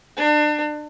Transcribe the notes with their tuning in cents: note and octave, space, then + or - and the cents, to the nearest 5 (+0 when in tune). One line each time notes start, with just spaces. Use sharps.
D4 +35